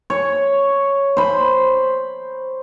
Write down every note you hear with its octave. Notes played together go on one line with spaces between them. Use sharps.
C#5
C5 B5